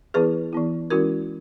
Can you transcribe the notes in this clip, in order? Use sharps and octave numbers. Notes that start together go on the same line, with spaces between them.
E3 B3 E4 G#4 B4
E3 B3 E4
E3 G#3 C#4 E4 F#4 A#4